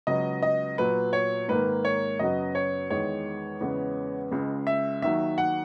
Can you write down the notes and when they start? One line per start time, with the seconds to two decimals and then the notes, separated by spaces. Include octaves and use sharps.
0.07 C#2 C#3 F#3 B3 D#5
0.42 D#5
0.78 A#2 F#3 B3 B4
1.13 C#5
1.48 G#2 D#3 A#3 B4
1.85 C#5
2.19 F#2 C#3 F#3 B3 D#5
2.55 C#5
2.90 E2 D#3 G#3 C#5
3.61 E2 C#3 G#3 B3
4.31 C#2 C#3 G#3
4.67 E5
5.02 D#2 D#3 F#3 E5
5.38 F#5